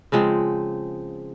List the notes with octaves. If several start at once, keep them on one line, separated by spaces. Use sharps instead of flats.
C#3 F3 G#3 C4